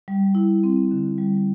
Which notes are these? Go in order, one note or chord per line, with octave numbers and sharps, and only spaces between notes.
G3
E4
C4
D3
G3